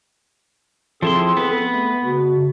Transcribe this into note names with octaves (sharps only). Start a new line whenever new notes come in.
F3 C4 E4 G#4 A4 C6
B3 B4
A3
C#3 F#4